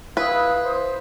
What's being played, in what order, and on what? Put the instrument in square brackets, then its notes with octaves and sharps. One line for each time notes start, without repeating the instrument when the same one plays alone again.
[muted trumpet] E4 [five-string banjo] B4 [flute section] F5 D#6
[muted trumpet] C5